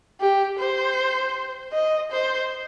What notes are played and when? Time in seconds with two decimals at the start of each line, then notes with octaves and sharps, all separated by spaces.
0.20 G4
0.59 C5
1.72 D#5
2.11 C5